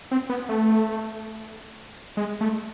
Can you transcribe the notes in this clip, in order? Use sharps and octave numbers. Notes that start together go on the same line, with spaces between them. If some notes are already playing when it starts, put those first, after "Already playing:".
C4
B3
A3
G#3
A3